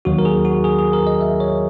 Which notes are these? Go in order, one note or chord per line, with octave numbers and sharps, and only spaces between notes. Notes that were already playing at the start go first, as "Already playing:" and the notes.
D#2 D#3 F#3 F#4
A#4
G#4
F#4
G#4
G#4
A#4
D#5
E5
C#5